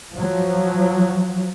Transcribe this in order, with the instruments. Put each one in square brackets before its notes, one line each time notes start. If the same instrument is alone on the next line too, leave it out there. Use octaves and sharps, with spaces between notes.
[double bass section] F3 F#3